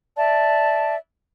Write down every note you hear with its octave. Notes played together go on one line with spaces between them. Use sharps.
D5 E5 A5